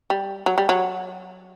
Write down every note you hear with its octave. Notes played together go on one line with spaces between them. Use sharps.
G3
F#3
G3
F#3